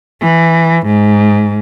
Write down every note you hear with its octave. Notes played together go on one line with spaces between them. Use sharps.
E3
G#2